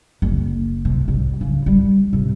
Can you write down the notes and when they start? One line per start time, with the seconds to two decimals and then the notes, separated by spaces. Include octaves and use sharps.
0.22 F#1
0.85 C3
1.08 C2
1.41 C#3
1.66 G3
2.13 C3